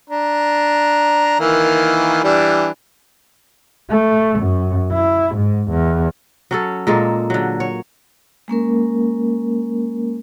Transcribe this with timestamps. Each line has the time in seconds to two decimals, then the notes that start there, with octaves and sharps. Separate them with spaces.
0.10 D4 A#5
1.40 D#3 E3 A#3
2.24 E3 G3 D4
3.90 A3
4.39 F#2
4.93 E4
5.35 G#2
5.70 E2
6.51 F#3 C#4 A4
6.87 A#2 G#3 A#3 A4
7.30 D3 F#3
7.60 C#5
8.48 G#3 A#3 C#4 A#4